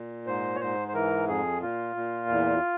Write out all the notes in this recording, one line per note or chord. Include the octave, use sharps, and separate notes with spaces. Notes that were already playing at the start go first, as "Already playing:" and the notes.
Already playing: A#2
G#2 C5
C#5
G#2 C5
C5
E3 A#4
F2 G#4
A#2 F4
A#2
E2